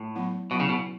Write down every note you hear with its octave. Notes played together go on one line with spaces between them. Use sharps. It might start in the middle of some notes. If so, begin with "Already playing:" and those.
Already playing: A2
F#3 B3 E4
B2 F#3 B3 E4
C#3
B2